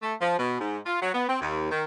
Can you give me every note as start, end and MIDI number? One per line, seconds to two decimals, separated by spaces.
0.02 0.14 57
0.21 0.37 53
0.39 0.60 47
0.60 0.79 44
0.86 0.98 65
1.02 1.13 54
1.14 1.26 59
1.29 1.38 60
1.41 1.69 39
1.71 1.84 51